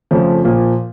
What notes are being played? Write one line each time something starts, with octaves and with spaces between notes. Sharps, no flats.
F2 C#3 F3 A3
A#2 F3 A#3